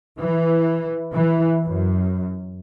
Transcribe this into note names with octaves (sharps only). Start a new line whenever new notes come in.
E3
E3
F#2